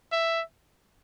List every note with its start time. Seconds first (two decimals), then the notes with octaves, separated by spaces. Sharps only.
0.12 E5